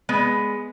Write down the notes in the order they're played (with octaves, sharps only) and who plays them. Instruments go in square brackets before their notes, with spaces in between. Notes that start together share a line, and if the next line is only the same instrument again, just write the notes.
[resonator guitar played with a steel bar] G#3 B3